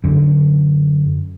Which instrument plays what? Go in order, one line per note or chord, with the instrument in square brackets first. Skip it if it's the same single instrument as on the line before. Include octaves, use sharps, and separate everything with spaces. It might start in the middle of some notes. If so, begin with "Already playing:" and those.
[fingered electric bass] F#2 D3